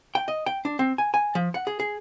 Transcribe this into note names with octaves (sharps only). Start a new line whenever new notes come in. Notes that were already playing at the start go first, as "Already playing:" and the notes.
G5
D#5
G5
D4
C4
G#5
G#5
F3
F#5
G#4
G#4